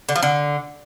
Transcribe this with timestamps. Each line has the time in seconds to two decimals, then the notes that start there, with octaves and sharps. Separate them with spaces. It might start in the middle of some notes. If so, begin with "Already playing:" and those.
0.09 D3
0.16 F3
0.23 D3